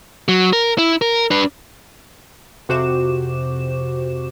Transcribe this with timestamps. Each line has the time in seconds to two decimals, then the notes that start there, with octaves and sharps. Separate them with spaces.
0.28 F#3
0.53 A#4
0.78 E4
1.02 A#4
1.31 D4 B4
2.69 F2 C3 F#4 C5 D6 E7